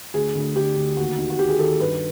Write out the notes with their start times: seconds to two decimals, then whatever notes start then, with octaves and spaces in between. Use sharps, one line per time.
0.14 D2 G#4
0.35 D2
0.56 D3 G4
0.76 D2
0.97 D#2 F#4
1.18 D#3
1.30 F#4
1.39 D#3 G4
1.49 G#4
1.59 D#3 A4
1.80 G2 B4